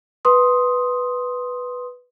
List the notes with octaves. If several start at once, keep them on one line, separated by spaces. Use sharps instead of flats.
B4 C6 D#6